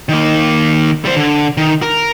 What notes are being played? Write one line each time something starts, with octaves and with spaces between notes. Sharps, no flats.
D#3 A#3
G3 C5
D3
D#3
A#4